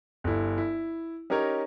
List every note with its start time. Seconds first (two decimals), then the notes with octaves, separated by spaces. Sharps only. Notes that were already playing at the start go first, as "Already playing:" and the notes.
0.24 G1 E4
0.58 E4
1.30 C#4 D#4 G4 A#4 C#5